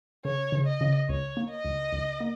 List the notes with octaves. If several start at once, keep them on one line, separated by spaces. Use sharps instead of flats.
C#3 C#5
C#3
D#5
C#3
C#2 C#5
A#3
D#5
C#2
C#2
A#3